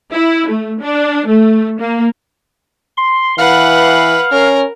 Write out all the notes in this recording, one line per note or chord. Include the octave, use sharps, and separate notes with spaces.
E4
A3
D4
A3
A#3
C6
E3 B4 F5 F#5
C#4 A#4